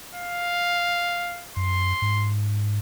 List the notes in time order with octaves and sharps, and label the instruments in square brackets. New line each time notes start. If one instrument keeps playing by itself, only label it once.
[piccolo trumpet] F5
[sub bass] F#2 [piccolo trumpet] C6
[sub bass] G#2